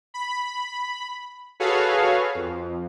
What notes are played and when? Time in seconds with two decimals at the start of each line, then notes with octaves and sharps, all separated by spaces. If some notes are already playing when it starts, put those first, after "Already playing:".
0.14 B5
1.60 F#4 G#4 A4 B4 C#5 F5
2.35 F2